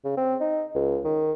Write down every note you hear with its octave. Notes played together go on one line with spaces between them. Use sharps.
C#3
C4
D#4
C#2
D#3